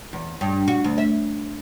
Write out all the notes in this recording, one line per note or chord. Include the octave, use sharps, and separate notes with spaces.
E2
G2
F#4
D2
E5